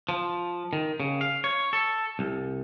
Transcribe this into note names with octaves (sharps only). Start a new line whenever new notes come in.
F3
D#3
C#3
F5
C#5
A4
C2